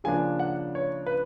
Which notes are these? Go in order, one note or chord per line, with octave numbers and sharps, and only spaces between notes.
C#3 F3 A#3 D4 G#5
F#5
C#5
B4